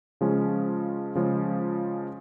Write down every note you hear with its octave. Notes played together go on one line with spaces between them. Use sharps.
C#3 F3 G#3 C#4
C#3 F3 G#3 C#4